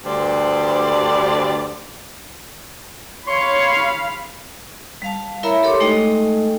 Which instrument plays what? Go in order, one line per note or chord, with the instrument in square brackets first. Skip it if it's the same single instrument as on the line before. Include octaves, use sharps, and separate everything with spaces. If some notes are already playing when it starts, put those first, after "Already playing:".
[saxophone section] D2 G2 C5 D5
[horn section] C#5 [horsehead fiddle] F5 B5 [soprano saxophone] C6
[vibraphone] G3 F5 A5
E4 A#4 C#5 E5 A#5 B5
G4 A4 C#5 C6 D6
G#3 A3 D#4 A4 D#5 G5